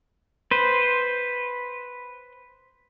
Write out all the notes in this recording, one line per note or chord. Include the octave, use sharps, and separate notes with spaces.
B4 C5